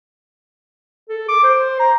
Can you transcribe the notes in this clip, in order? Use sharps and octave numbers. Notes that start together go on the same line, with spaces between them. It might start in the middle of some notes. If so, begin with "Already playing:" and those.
A4
D6
C5
A#5